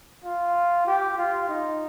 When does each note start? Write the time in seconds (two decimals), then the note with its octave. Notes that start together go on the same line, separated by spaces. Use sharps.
0.24 F4
0.87 G4
1.18 F4
1.49 D#4